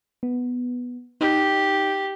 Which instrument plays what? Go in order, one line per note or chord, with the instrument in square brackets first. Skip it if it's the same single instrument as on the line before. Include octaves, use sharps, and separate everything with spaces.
[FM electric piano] B3
[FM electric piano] D#4 [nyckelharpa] G4